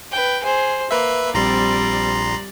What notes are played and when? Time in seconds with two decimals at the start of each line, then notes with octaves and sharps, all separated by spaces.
0.12 B4 G5
0.43 G#4 C5
0.91 A#3 B4 E5
1.34 A#1 G3 C4 D5 A#5 C6